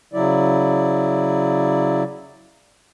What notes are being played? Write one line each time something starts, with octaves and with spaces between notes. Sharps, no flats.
C#3 F#3 E4 D5